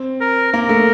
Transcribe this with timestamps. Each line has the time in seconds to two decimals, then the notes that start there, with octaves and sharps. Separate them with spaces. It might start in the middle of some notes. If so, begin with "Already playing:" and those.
Already playing: C4
0.21 A#4
0.53 A#3 A#4
0.69 A3